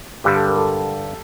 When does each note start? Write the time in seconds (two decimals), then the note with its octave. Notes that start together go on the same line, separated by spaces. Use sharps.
0.24 G2 D3 G3 G4
0.36 A4
0.47 A#4
0.57 A4